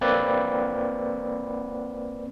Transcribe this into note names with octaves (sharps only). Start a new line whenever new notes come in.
A#3 C4 B4 D5